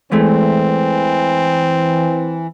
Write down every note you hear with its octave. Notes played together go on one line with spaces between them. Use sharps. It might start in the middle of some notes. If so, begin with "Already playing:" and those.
E2 E3 G#3 A3 C4